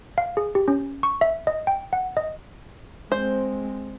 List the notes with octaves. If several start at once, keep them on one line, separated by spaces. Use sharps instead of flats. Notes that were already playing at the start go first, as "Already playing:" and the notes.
F5
G#4
G4
C#4
C#6
E5
D#5
G5
F#5
D#5
G#3 C4 C5